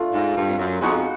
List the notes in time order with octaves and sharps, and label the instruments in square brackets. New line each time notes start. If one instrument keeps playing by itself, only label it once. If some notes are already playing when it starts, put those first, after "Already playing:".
Already playing: [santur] A3 D4 F4
[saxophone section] G#2
G2
F2
F#2
[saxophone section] F2 [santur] G#3 B3 D#4 F#4